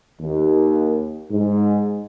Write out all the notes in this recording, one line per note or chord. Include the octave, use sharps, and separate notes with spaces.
D#2
G#2